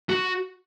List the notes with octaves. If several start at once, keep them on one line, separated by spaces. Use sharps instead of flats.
F#4